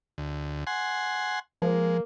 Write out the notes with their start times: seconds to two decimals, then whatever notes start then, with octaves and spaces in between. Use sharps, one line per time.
0.18 D2
0.67 F#5 G#5 C6
1.62 F3 G#3 A#3